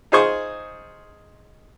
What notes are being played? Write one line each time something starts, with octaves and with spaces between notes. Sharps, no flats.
D#4 F4 G#4 C5 G#5 C#6